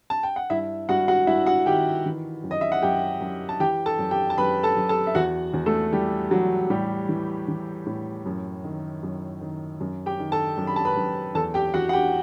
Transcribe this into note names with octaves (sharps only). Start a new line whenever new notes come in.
A5
G5
F#5
G2 E4 E5
G2 F#4 F#5
F#4 F#5
G2 E4 E5
F#4 F#5
D#3 G4 G5
E3
F#2
D#5
E5
F#5
F#2 G4 G5
F#2
A5
E3 G4 G5
A4 A5
F#2
G4 G5
A5
F#2 B4 B5
A4 A5
F#2
A4 A5
E5
E2 F#4 F#5
E2
A3 A4
E3 G3 G4
E2 F#3 F#4
A2 G3 G4
E3
E3
A2
F#2
D#3
F#2
D#3
F#2
G4 G5
D#3
A4 A5
F#2
B5
A5
B4 B5
F#2
E2 A4 A5
G4 G5
E3 F#4 F#5
F#5
G4 G5